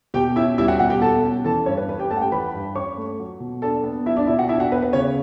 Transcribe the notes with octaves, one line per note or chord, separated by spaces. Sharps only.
B2 G4 G5
C#4 E4 E5
G3 E4 E5
F#4 F#5
B2 F#4 F#5
G4 G5
B2 A4 A5
C#4
E3 A4 A5
G2 C#4 C#5
B4
C#4 B4
G4 G5
A3 A4 A5
F#5
G4 G5
E3 B4 B5
G2
C#4 C#5 C#6
A3
F#3
B2
D4 A4 A5
B3
F#3 E4 E5
D4 D5
B2 E4 E5
F#4 F#5
D4 E4 E5
F#4 F#5
B3 B4
B4
C#3 C#4 C#5